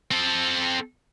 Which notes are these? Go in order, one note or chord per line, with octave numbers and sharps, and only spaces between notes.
C4 A4